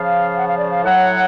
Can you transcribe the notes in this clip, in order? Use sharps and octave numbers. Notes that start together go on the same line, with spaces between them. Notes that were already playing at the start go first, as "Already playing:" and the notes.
Already playing: C#3 F3 F5
F#5
F5
D5
F5
A2 F#3 F#5